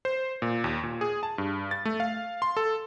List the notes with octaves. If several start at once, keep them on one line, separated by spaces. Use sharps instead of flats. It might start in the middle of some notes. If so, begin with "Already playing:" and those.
C5
A#2
D#2
A#2
G#4
A5
G2
A6
A3
F5
C6
A4